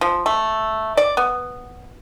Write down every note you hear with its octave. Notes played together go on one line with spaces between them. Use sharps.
F3
A3
D5
B3